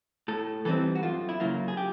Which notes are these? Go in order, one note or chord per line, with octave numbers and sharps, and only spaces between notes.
A2 A4
E3 G3 C4 D#4 A4
F#4
F#2 F4
E4
C#3 F#3 A#3 F4
G#4
G4